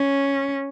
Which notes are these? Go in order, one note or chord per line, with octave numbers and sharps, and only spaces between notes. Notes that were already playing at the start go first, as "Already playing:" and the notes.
Already playing: C#4